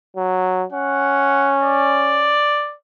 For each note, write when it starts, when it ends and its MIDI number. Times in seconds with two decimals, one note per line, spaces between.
0.17 0.64 54
0.73 2.40 61
0.73 1.53 78
1.61 2.75 74